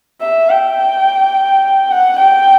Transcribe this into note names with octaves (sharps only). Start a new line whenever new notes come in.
E5
G5
F#5
G5